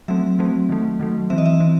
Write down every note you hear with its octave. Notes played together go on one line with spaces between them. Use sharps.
F#3 A3 C4 E5
F#3 A3 C4
D#3 F#3 A3
D#3 F#3 A3
E3 C4 E5
D#5
E5
E3 C4